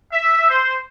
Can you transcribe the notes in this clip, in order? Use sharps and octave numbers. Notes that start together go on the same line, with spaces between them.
E5
C5